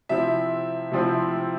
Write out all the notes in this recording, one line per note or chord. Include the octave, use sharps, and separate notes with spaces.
C3 F3 C4 E4 E5
C3 F3 C4 E4